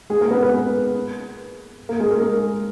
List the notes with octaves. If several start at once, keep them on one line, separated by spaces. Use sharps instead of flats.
G#3 G#4
A#3 A#4
B3 B4
B3 B4
A#3
G#3 G#4
A#3 A#4